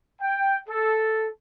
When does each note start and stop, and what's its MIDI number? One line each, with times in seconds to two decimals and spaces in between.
0.21 0.57 79
0.69 1.28 69